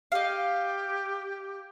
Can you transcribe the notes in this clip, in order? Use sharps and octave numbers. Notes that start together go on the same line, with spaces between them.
G4 D#5 F5